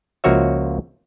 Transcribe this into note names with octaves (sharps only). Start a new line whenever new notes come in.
C#2 F3 A#3 F#4 C#5 E5